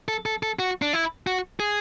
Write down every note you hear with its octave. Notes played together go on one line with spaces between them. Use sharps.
A4
A4
A4
F#4
D4
E4
F#4
G#4